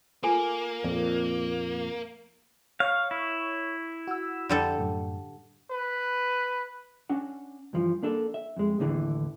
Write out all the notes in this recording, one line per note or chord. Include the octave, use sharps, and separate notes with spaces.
A#3 F4 A4 G#5
F2 A#2
C#5 F5 C#6
E4
F#4 E6
F2 D3 G3 A4
F#2 A2
B4
C#4 D4 F#5
G2 E3 F3
A#3 D4 A4
E5
F2 G#3
D#2 A2 D3 E3